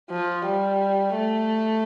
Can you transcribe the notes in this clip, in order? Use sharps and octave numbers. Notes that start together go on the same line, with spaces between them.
F3
G3
A3